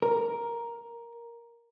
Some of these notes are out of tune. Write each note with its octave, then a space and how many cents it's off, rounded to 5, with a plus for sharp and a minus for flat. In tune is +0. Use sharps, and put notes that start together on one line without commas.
A#4 +5